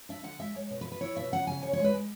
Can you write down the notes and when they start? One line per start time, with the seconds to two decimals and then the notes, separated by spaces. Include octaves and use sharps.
0.09 D4 E5
0.24 D3 F#5
0.39 G#3 E5
0.55 G#3 C#5
0.71 B2
0.81 B4
0.85 E4
0.92 B4
1.01 E4 C#5
1.17 B2 E5
1.32 C#3 F#5
1.47 C#3 G#5
1.63 C#3 C#5
1.73 C#5
1.79 G#3
1.84 B4
1.94 G#3